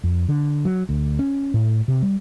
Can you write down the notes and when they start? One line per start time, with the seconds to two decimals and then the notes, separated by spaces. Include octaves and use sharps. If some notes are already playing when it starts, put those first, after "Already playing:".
0.04 F2
0.29 D3
0.65 F#3
0.89 D2
1.19 C#4
1.54 A2
1.88 C3
2.02 G3